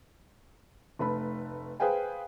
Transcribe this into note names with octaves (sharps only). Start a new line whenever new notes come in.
F1 A3 B4 B5
G#4 B4 C5 F5 G5 G#5